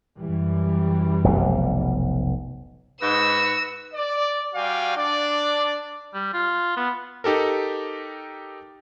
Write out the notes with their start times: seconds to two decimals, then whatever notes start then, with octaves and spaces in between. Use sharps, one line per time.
0.18 F#2 E3 G3
1.24 F1 B1 B2
3.02 G#2 F#4 B4 E6
3.94 D5
4.55 G3 F#4 D5 F5 G5 G#5
4.96 D4 D5
6.14 G3
6.34 F4
6.77 B3
7.24 D#4 G4 A4 A#4